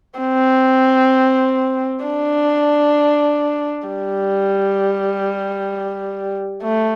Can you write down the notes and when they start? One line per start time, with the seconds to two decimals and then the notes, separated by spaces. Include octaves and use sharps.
0.19 C4
2.03 D4
3.87 G3
6.62 A3